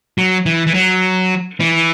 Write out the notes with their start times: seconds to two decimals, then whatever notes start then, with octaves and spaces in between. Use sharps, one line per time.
0.18 F#3
0.46 E3
0.67 E3
0.74 F#3
1.60 E3